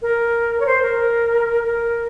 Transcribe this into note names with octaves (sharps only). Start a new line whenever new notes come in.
A#4
C#5
C5
A#4
A#4